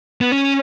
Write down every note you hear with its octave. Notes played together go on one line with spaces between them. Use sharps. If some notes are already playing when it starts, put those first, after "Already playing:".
B3
C#4